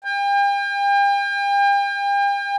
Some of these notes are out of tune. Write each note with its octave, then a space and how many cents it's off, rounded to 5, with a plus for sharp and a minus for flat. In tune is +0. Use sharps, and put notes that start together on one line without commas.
G5 +40